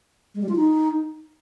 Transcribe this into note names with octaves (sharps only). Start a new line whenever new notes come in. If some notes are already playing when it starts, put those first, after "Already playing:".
G#3
G3
F4
D#4